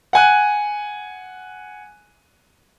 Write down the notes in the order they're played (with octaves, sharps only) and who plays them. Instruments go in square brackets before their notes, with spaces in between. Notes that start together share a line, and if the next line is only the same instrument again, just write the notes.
[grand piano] F#5 G#5 F#6